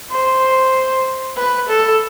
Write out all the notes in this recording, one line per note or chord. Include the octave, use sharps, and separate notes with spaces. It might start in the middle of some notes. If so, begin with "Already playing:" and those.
C5
B4
A4